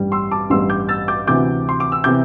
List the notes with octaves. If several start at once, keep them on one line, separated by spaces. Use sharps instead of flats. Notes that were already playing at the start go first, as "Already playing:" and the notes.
Already playing: A1 G2 G3
C6 E6
A5 D6
A1 G2 G3 C6 E6
D6 G6
E6 A6
D6 G6
D2 C3 E3 D6 G6
C6
D6
E6
C3 E3 D6 G6